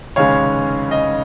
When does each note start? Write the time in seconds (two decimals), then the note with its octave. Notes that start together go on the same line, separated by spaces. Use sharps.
0.16 F1 D#2 C#3 G#3 C#4 C#5 F5
0.91 D#5